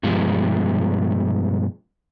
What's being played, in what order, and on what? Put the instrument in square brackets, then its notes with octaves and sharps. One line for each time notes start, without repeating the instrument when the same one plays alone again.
[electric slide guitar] G2 B2 F3 G#3